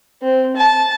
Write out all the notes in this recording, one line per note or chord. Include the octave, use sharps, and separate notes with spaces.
C4
A5